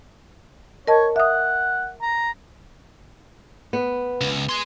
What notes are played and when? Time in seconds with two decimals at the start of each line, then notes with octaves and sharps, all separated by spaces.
0.87 A#4 C#5 D#5 A5
1.16 E5 F#5 D#6
2.02 A#5
3.73 B3
4.21 C#2
4.49 G#4 C6